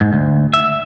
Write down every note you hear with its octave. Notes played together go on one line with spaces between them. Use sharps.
G#2
D2
E5